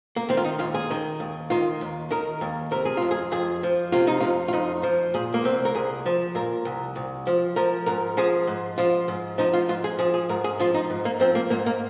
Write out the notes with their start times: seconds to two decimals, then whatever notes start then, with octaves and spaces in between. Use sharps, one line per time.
0.16 A#3
0.29 D#3 C4
0.37 F4
0.45 D#4
0.59 D#2 F4
0.74 G#4
0.90 D#3
1.20 D#2
1.50 D#3 F4
1.81 D#2
2.11 D#3 A#4
2.41 D#2
2.71 C3 A#4
2.85 G#4
2.97 F2 F4
3.11 G#4
3.32 F2 G#4
3.63 F3
3.92 C3 F4
4.07 D#4
4.20 F2 F4
4.48 F4
4.53 F2 D#4
4.83 F3
5.14 A#2 G#4
5.34 A#3
5.44 C2 C4
5.65 A#4
5.75 C2 G#4
6.06 F3
6.35 A#2 A#4
6.65 C2
6.96 C2
7.27 F3
7.56 F3 A#4
7.86 G#2 A#4
8.17 F3 G#4
8.47 G#2
8.78 F3 F4
9.08 G#2
9.38 F3 D#4
9.53 F4
9.69 G#2 F4
9.84 G#4
9.99 F3 G#4
10.14 G#4
10.29 G#2 A#4
10.44 G#4
10.60 F3 F4
10.74 D#4
10.90 G#2
11.05 A#3
11.20 F3 C4
11.35 A#3
11.50 G#2 A#3
11.66 A#3